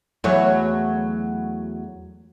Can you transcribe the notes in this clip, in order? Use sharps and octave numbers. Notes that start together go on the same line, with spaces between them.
E2 F#3 A3